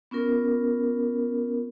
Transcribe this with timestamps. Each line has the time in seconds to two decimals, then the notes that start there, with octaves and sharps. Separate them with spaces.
0.11 B3 C#4 F4 A#4